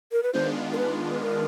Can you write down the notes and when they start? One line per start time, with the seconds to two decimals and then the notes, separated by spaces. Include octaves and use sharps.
0.12 A#4
0.23 B4
0.33 D#3 G#3 B3 D4 F4 C5
0.73 A#4
0.78 B4
1.10 B4
1.21 A#4